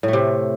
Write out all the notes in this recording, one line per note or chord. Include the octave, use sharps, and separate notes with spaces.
A2
A3
C3